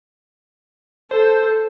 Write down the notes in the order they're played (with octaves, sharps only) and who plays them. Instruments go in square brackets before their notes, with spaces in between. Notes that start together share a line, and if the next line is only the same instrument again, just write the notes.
[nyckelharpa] A4 [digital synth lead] C5